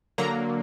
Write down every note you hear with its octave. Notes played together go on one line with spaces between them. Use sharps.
D3 F#3 A#3 A#5